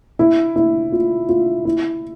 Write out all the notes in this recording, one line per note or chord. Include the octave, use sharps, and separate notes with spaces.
E4
E4
F4
F4
E4